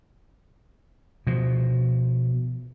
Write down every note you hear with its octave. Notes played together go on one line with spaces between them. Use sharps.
B2 F3